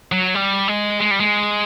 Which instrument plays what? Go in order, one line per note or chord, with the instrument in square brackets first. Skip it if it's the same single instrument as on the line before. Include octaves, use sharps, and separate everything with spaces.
[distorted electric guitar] F#3
G3
G#3
G#3
G3
G#3